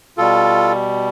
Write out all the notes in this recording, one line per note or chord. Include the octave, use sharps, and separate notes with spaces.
B2 G3 F4 A4